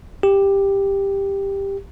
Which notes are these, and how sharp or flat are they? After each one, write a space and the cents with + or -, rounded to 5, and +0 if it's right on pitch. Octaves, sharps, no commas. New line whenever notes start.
G4 +10